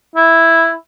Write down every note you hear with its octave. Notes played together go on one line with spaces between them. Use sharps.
E4